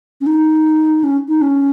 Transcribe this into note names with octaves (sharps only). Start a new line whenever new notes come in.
C#4
D#4
C#4
D#4
C#4